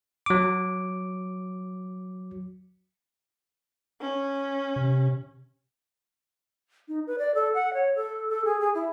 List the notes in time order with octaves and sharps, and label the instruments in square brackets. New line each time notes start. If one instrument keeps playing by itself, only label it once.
[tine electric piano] F#3 D6
[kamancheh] C#4
[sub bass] C3
[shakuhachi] D#4
B4
D5
A4
F#5
C#5
A4
A4
G#4
G#4
E4